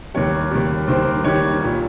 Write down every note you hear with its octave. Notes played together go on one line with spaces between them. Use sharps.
D#2 D#3 G3 C#5
D#2 D#3 G3
D#2 D#3 G3 C5
D#2 D#3 G3 C#5
C2 A#2 G3